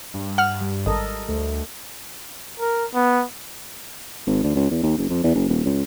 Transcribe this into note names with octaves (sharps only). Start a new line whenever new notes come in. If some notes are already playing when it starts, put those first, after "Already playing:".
G2 G3
F#5 F6
G3
G#1 A4 A#4 D#5
D2 A3
A#4
B3
G#1
D2
C#2
E2
D#2
F#1
F2
E2
F#1
D#1
C#2